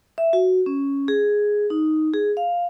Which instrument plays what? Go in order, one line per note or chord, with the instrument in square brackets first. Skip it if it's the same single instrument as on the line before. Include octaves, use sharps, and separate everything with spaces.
[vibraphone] E5
F#4
C#4
G#4
D#4
G#4
F5